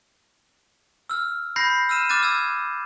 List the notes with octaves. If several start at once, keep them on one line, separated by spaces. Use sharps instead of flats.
E6 F6
B5 G6 A#6 C7
E6 F6 D#7 E7
D6 F6 F#6 A6 D#7
E6 G#6 A6